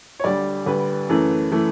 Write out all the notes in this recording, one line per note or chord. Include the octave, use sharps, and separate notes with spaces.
C#5
D2 D3 G3 D5
D2 D3 G3 B4
F#2 E3 A3
E3 A3